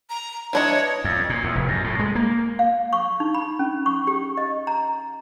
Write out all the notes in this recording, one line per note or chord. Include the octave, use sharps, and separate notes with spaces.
A#5
E3 D4 C#5 D#5
F2
A#2
E2
F1
F#2
A2
G#3
A#3
F5
C#6
D#4
B5
C#4
C#6
G4
D#5
A#5